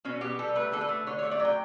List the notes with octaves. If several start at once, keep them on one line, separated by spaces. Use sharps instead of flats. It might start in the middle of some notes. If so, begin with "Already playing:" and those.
B2 C#4
B3 G4
G3 A4
A3 B4
D3 A4
B4
A3
D3 C#5
C#5
A3
D5
F#3
G5